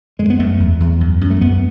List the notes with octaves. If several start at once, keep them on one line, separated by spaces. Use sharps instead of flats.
F#2 G#3
B3
F#2 A3
E2
E2
F#2
F#2
A3
F#2 B3